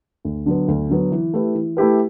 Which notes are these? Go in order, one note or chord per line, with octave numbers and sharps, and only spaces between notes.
D2
D3 F#3 B3
D2
D3 F#3 B3
E3
A3 E4 G4 B4
E3
A3 E4 G4 B4